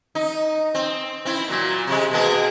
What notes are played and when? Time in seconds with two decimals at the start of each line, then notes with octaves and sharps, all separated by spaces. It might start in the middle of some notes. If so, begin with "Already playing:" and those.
0.15 D#4
0.75 C4
1.25 C4 E4
1.48 A#2 F#3
1.87 C3 G#3
2.11 B2 A#3 G#4